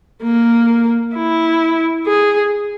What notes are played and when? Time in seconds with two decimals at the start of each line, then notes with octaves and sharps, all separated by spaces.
0.23 A#3
1.15 E4
2.07 G#4